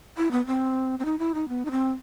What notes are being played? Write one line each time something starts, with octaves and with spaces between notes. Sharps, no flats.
E4
B3
C4
C4
D#4
E4
D#4
B3
D#4
C4